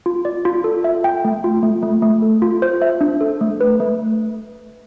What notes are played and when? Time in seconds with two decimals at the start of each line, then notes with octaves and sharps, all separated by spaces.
0.06 F4
0.25 D5
0.45 F4
0.64 A4
0.84 E5
1.04 G5
1.25 A3
1.44 F4
1.63 A3
1.83 A3
2.02 A3
2.22 A4
2.42 F4
2.62 C5
2.82 E5
3.01 D4
3.21 A4
3.41 A3
3.61 B4
3.80 A3